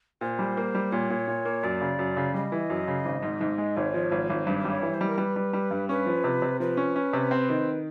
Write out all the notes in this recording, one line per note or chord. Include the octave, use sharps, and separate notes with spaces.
A#2 C5
G3
A#3
G3
A#2 C#5
A#2
A#2
A#3
F#2 D5
C#3
F#2
C#3
G3 D#5
E3
F#2
C#3
G#1
G#2
G#2
G#3
G#1 C#5
F3
G#1
G#1
G2 C5
C5
G3
C#5
E3
C5
G3
A#4
G3 B4
G3
G3
G2
C#4 B4
F3
C3
C3
F3 B4
C#4
C#4
C3
C4
D#3